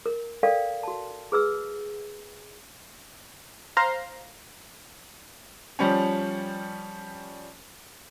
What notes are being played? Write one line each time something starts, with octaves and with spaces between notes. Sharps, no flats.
A#4
A4 A#4 D5 F5 G5
F#4 A5
G#4 B4 E6
C5 F5 A#5 C6
F3 G3 C#4